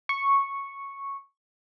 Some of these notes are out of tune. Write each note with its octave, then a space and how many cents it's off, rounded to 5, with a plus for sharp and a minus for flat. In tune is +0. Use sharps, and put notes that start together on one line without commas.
C#6 -5